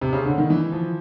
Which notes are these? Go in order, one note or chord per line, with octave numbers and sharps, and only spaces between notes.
C3
C#3
D3
D#3
E3
F3